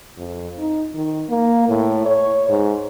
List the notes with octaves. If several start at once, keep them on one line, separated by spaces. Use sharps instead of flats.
F2
D#4
D#3
A#3
A2
C#5
G#2